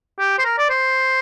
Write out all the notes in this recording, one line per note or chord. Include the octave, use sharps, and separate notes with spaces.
G4
C5
A#4
D5
C5